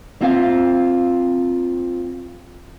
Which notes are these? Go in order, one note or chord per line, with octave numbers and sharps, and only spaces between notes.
A#3 C4 F4 E5 F5